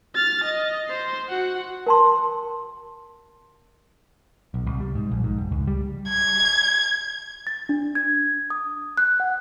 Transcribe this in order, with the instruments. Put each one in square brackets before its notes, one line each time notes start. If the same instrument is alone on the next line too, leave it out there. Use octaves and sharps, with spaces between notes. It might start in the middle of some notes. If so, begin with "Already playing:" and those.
[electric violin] F6 A6
D#5
C5 C6
F#4 F#5
[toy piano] A#4 A5 C6
[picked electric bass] B1
C2
G3
G#2
A#1
G#2
F1
C#2
G3
[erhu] G#6
[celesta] A6
D4
G#6
D#6
F#6
F#5